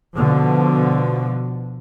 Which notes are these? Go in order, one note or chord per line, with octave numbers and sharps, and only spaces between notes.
B2 D3 F3